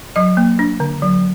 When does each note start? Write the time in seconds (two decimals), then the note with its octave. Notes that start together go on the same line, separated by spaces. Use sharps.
0.16 F#3 D#5
0.37 A#3
0.59 D4
0.80 D3
1.02 F#3